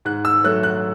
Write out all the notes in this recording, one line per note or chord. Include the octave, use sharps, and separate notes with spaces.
G#2 F#6
E6
F#3 A3 F#6
F#6